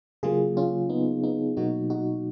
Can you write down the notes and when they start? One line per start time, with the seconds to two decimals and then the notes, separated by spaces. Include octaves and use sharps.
0.23 C#3 F#3 A#3 F4 G#4
0.57 C#4 F4
0.89 B3 D#4
1.23 B3 D#4
1.57 B2 F#3 A#3 D#4 F#4
1.90 D#4 F#4